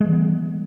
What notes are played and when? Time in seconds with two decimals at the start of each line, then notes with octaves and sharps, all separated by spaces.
0.01 G#3
0.04 E3
0.08 G3
0.12 B3